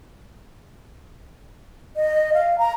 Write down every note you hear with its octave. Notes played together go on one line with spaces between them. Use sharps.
D#5
F5
A#5